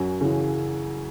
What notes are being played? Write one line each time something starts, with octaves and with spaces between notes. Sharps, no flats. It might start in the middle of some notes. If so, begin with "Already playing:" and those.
Already playing: F#2 C#4 F#4
C#3 E3